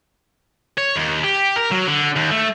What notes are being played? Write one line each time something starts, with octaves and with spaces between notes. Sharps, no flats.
C#5
D#2
G4
A#4
F#3
D3
D#2
A3